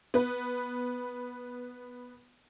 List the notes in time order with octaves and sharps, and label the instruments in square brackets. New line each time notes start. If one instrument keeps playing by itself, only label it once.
[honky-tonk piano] B3 B4